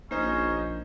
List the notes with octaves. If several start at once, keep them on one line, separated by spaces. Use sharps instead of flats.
A#1 A#3 C#4 D#4 C5 D#5